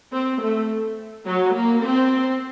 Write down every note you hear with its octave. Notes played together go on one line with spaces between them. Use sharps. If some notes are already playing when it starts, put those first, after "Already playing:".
C4
A3
F#3
A#3
C4